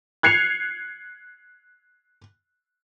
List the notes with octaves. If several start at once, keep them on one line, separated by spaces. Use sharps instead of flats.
F#6 G#6 C7 C#7 F7